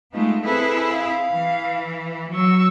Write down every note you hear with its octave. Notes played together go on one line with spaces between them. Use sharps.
G#3 A3 B3 D#4 F4
C4 E4 G#4 A4 B4
F5
E3
F#3 C#6 E6